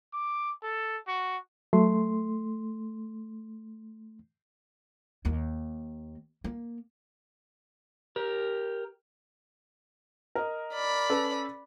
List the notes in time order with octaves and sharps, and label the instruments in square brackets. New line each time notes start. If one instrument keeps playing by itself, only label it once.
[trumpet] D6
A4
F#4
[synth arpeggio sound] F#3 [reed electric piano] A3 C6
[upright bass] D#2 A#3
A#3
[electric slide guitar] G4 A#4
[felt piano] A#4 D#5
[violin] D5 B5
[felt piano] C#4 A4 B4